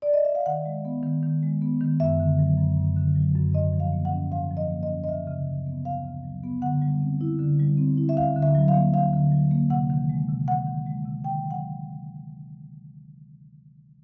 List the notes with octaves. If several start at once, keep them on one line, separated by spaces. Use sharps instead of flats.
D5
D#5
E5
F5
D#3 F#5
G#3
B3
D#3
D#3
G#3
B3
D#3
F#2 E5
D3
F#3
F#2
F#2
D3
F#3
F#2
G#2 D#5
F3
F5
A#3
F#5
C#4
G#2 F5
F3
D#5
A#3
D#5
C#4
D#5
D2 E5
C#3
F#3
B3
D2 F5
C#3
F#3
B3
D3 F#5
G3
C4
E4
D3
G3
C4
E4
E5
D2 F5
D3
E5
F#3
F5
A#3
D2 F5
D3
F#3
A#3
C3 F#5
D#3
G#3
C3
C3 F#5
D#3
G#3
C3
D#3 G5
F#3
F#5